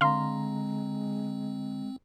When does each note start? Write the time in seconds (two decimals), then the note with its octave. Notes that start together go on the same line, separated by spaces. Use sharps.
0.01 D3 G#3 C4 F5 A#5 C6